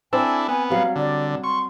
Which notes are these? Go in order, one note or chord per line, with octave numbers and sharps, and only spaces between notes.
C4 D4 E4 A4 G#5
B3 G#5
F#3 G3 F5
D3 D5
C6 C#6